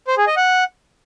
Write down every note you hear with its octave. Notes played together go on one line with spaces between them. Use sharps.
C5
G#4
D#5
F#5